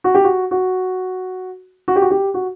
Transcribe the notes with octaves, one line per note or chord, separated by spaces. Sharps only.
F#4
G4
F#4
F#4
F#4
G4
F#4
G4
F#4